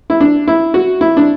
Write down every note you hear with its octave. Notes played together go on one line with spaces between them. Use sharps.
E4
D4
E4
F#4
E4
D4